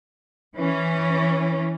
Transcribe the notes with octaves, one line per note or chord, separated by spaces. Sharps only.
E3 C#4